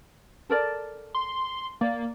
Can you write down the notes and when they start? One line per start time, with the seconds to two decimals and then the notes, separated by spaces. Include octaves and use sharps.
0.50 A4 A#4 D5
1.15 C6
1.81 A#3 D5